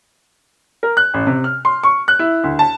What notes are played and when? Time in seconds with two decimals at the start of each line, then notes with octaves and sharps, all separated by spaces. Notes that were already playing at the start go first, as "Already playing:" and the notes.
0.83 A#4
0.97 F#6
1.14 A1
1.27 C3
1.44 F6
1.65 C6
1.83 C#6
2.08 F#6
2.19 E4
2.44 D2
2.59 A5